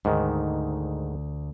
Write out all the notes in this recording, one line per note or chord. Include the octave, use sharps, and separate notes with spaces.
D2 G#2 D#3